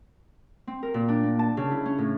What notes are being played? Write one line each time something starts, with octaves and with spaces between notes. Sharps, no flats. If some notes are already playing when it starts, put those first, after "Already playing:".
C4
A#4
A#2
D4
A#3
A5
C#3
E4
C#4
A2